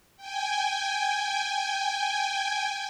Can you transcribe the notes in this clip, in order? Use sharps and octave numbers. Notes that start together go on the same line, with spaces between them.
G5 G#5